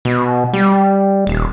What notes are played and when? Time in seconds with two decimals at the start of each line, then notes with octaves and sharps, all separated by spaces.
0.05 B2
0.53 G3
1.27 D#1